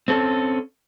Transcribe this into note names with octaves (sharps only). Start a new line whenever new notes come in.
C4 C#4 A4